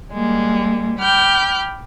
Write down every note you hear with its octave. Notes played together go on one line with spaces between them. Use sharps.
G3 G#3 A#3
G5 B5 D6 F6 G6